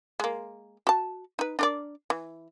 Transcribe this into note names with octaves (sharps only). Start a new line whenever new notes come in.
G#3 A#3
F#4 A5
D#4 B4
D4 A#4 D5
E3